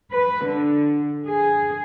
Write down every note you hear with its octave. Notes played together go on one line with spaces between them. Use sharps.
B4
D3
G#4